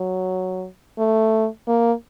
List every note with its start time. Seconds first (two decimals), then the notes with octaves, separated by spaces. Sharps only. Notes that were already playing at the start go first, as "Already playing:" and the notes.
Already playing: F#3
0.98 A3
1.68 A#3